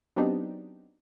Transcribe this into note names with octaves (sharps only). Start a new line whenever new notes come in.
F#3 B3 C4 D4 D#4 G4